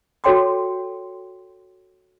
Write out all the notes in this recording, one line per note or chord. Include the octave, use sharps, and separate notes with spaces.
F#4 A4 C#5 G5 C6 D6